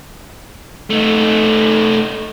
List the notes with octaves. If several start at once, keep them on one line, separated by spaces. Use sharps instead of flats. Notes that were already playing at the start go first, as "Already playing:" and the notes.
A3 D#4